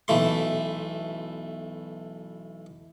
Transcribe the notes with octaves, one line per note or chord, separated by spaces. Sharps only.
B1 E3 A3 C6